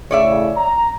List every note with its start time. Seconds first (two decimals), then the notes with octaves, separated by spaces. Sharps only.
0.11 A2 C#3 C#5 D5 E5
0.57 A#5